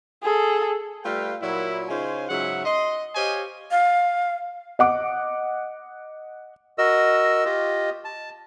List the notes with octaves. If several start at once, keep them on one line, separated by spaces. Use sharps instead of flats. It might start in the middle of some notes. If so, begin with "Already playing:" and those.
G#4 A4
G3 A3 F4 B4 F5 G5
A#2 F#3 E4
C#3 D#4 F4 C5 C#5 G#5
G#2 C#3 F#3 G#3 E5 F#5
D#5 C6
G4 C5 C#5 D#5 F5 G#5
F5
D#5 F#5 D6
F#4 A#4 D#5 E6
F4 G4 D#5
A5